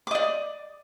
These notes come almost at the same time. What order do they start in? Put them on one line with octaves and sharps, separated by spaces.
D6 D#5 D5